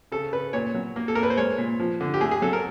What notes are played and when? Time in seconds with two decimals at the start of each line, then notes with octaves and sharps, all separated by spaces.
0.12 C#3 A4
0.33 C#3 B4
0.53 A#2 C#5
0.74 F#3
0.96 A#3
1.08 A4
1.15 A#3 A#4
1.23 B4
1.30 C5
1.37 G#3 C#5
1.58 A#2
1.80 F3
2.00 D3
2.14 G4
2.21 A3 G#4
2.31 G#4
2.42 F#3 A4
2.53 A#4